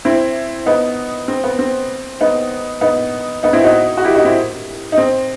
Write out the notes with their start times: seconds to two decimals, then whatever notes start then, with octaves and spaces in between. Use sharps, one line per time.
0.05 C4 E4
0.66 B3 D#4
1.28 C4
1.44 B3
1.59 C4
2.21 B3 D#4
2.81 B3 D#4
3.43 B3 D#4
3.53 C4 E4
3.64 D#4 F#4
3.97 F#4
4.04 E4 G4
4.15 D#4 F#4
4.25 C4 E4
4.92 D#4
4.98 C4